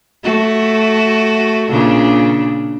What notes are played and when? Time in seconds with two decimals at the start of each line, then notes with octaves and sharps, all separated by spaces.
0.24 A3 F#4
1.70 A#2 C#3 D4